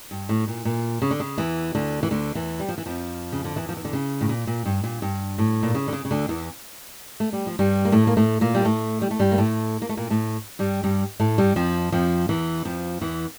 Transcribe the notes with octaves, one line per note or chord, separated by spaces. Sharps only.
G2
A2
A#2
A#2
C#3
D3
C#3
E2 E3
D2 D3
E3
D2 D3
E2 E3
G3
F3
E3
F2 F3
C#3
D3
E2 E3
F3
E3
D3
C#3
A2
A#2
A#2
G2
A#2
G2
A2
A#2
C#3
D3
C#3
C#3
D2 D3
E2 E3
A3
G3
F3
G2 G3
A#3
A2 A3
A#3
A2 A3
A#2 A#3
G3
A2 A3
G3
A3
G2 G3
A#3
A2 A3
A#3
A3
A#2 A#3
A2 A3
G2 G3
G2 G3
A2 A3
G2 G3
F2 F3
F2 F3
E2 E3
F2 F3
E2 E3